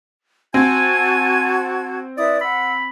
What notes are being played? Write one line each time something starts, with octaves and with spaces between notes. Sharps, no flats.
C4 F#4 G#5 A5 G#6
E4 B4 D5 D#6
F#5 B5 E6